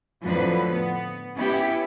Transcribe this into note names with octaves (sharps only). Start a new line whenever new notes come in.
F2 A2 D3 F3 F#3 B4
B3
B3 C#4 E4 G4